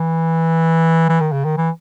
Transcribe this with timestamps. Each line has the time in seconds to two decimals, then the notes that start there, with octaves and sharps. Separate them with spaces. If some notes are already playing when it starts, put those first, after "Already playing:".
Already playing: E3
1.09 E3
1.21 D#3
1.32 C#3
1.45 D#3
1.57 E3